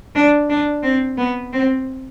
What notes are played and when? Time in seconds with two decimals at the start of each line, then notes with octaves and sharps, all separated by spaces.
0.15 D4
0.50 D4
0.83 C4
1.18 B3
1.53 C4